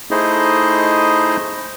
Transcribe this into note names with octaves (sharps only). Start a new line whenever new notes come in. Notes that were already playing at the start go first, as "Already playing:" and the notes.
A3 D#4 E4 G#4 C5 D#5